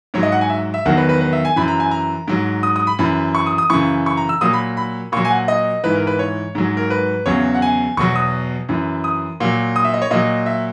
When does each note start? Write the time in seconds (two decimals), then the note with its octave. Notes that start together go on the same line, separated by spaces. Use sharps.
0.14 G#2 F#3 C#5
0.23 D#5
0.32 F#5
0.41 G#5
0.50 E5
0.74 E5
0.85 E2 D#3 F#3 F#5
0.97 B4
1.09 B4
1.21 B4
1.33 E5
1.45 G#5
1.56 F#2 E3 B5
1.68 A#5
1.80 G#5
1.91 A#5
2.28 G#2 F#3
2.63 D#6
2.76 D#6
2.87 B5
2.99 F#2 E3 B5
3.35 C#6
3.46 D#6
3.58 D#6
3.70 F#2 C#3 E3 C#6
4.06 C#6
4.17 A#5
4.29 E6
4.41 A#2 F#3 D#6
4.53 B5
4.77 B5
5.12 A#2 F#3 C#6
5.25 G#5
5.31 F#5
5.48 D#5
5.84 G#2 E3 B4
5.95 A#4
6.07 B4
6.19 C#5
6.55 G#2 F#3
6.77 A#4
6.90 B4
7.26 E2 C#3 F#3 C#5
7.55 F#5
7.62 G#5
7.97 E2 B2 F#3 C#6
8.15 D#6
8.69 F#2 E3
9.04 D#6
9.40 A#2 F#3
9.76 D#6
9.85 E5
9.94 D#5
10.02 C#5
10.11 A#2 F#3 D#5
10.46 E5